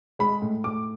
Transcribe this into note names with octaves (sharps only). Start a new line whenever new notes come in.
G#3 B5
A2
A2 D6